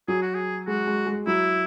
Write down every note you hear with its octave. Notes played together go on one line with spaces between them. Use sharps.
F#3 G#4
F#4
G#4
G#3 F#4
G#3
G#3
F#3 E4